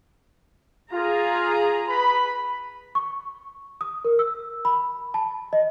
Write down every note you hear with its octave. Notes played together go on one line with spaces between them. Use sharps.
F4 G#4 A#5
B4 B5
C#6
D#6
A#4
E6
B5
A5
D#5